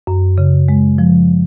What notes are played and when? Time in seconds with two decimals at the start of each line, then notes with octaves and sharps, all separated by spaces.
0.07 F#2
0.38 C#3
0.68 G#3
0.98 F3